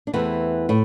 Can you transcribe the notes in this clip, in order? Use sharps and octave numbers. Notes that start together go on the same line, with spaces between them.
D4
E2 E3 A3 C4
A2